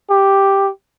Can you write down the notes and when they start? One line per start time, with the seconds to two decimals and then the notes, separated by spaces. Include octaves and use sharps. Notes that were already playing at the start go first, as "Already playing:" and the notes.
0.11 G4